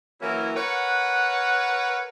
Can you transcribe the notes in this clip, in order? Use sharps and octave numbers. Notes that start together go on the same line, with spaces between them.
E3 F#3 A#3 C#4 E4 A#4
A#4 B4 C#5 F#5